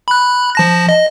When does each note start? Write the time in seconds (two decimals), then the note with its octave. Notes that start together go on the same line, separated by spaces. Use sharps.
0.08 B5 F#6
0.55 F3 A5 A#6
0.89 D#5